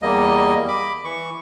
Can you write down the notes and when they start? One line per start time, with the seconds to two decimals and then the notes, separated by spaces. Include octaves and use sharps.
0.02 E2 G3 A#3 D#5
0.68 B5 D6
1.05 E3 C#6